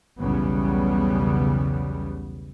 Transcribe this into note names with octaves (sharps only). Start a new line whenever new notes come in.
B1 E2 C#3 G3 B3